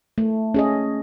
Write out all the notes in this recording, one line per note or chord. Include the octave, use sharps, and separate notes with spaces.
A3
C#4 G#4 D#5